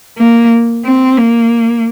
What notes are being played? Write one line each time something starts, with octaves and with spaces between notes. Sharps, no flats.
A#3
C4
A#3